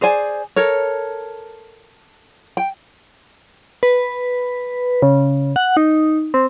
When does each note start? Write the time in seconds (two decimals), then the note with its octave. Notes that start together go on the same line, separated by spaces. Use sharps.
0.01 G#4 C5 D5 G#5
0.56 A4 A#4 C#5
2.57 G5
3.83 B4
5.02 C#3
5.56 F#5
5.77 D#4
6.34 C4